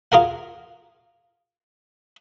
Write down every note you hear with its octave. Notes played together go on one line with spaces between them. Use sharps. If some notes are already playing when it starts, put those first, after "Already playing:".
F4 G#4 A#4 F#5